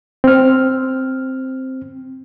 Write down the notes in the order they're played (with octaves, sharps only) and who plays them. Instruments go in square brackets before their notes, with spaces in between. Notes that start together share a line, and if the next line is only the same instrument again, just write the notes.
[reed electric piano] C4 F6